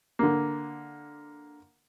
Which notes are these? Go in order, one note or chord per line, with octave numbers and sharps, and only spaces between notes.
D3 A#3